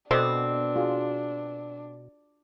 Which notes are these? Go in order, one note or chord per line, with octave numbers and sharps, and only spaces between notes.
B2 C4 D4 A4 D5 D#5
F4 F#4 G#4